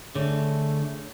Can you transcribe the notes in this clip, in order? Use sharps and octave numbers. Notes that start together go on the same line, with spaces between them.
D3 A3 G#4 C#5